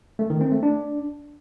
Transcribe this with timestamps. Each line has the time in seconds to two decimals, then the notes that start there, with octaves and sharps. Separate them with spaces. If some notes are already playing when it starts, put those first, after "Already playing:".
0.19 A3
0.30 D#3
0.41 C4
0.52 A3
0.63 D4